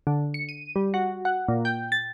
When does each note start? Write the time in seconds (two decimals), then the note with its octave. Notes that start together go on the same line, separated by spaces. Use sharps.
0.07 D3
0.34 C#7
0.49 D#7
0.76 G3
0.94 F#4
1.25 F#5
1.48 A#2
1.65 G5
1.92 A6